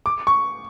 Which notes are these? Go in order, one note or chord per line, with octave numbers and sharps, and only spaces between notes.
D6
C#6